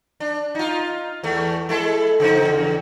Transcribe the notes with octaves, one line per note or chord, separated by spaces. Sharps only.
D4
D#4 F4
E2 A3
G#3 E4 A4
C#3 F3 D#4
E2 C#3